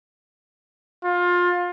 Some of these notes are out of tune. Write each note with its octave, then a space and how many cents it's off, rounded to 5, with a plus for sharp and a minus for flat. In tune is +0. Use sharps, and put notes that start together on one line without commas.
F4 +20